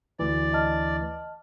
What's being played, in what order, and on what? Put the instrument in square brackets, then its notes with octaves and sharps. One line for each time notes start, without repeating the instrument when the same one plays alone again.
[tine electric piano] D2 E3 [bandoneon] D5
[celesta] D#5 A5 F6